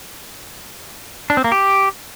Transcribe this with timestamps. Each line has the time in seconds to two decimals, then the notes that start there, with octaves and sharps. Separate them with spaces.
1.30 D4
1.37 C4
1.44 A#3
1.52 G4